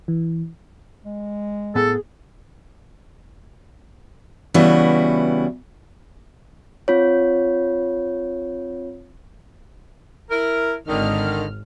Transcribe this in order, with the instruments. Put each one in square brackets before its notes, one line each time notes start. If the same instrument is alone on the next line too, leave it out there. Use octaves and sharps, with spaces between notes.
[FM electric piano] E3
[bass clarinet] G#3
[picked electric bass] A2 B3 [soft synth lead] G#4 [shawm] A4
[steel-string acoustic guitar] C#3 E3 G3 B3 E4 F#4
[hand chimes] C4 F4 C#5
[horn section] E4 A#4
[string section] G#1 F6 [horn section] D3 D#3